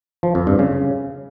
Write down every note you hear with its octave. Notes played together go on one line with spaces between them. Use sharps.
F3
F2
G2
C#3